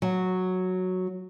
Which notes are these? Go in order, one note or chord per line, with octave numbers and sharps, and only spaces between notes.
F#3